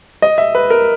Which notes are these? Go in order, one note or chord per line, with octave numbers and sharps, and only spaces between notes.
D#5
E5
B4
A#4